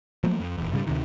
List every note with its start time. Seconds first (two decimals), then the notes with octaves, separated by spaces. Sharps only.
0.24 F3 F#3 A3 A#3
0.40 F2
0.58 D#1 E2
0.72 G#2 C#3 F#3 G3
0.87 D2 C3 D#3